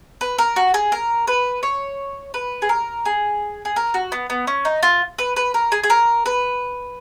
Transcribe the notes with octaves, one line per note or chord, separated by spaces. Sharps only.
B4
A#4
F#4
G#4
A#4
B4
C#5
B4
G#4
A#4
G#4
G#4
A#4
F#4
B3
B3
C#4
D#4
F4
B4
B4
A#4
G#4
G#4
A#4
B4